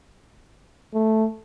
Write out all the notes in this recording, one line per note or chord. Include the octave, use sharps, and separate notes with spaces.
A3